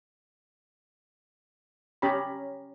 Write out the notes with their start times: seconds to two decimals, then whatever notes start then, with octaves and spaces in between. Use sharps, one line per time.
2.02 C#4 G4 C#5 A#5 B5